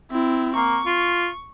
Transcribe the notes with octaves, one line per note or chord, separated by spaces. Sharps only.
C4 E4
A#3 C#6
F4